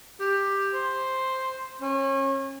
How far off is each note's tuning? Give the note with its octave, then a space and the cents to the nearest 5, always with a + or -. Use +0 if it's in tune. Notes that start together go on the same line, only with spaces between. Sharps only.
G4 +10
C5 +0
C#4 -30